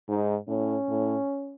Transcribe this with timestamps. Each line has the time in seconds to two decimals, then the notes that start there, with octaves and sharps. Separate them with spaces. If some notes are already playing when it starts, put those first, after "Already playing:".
0.08 G#2 D#4
0.48 A2 C#4
0.88 A2